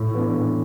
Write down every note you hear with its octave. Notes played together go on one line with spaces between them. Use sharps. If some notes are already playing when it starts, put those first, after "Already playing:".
Already playing: A2
E3 B3 D4
A2